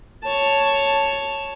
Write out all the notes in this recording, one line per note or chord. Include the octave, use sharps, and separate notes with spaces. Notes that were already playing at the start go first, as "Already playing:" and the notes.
C#5 A5